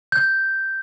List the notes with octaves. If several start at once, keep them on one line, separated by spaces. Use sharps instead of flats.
G6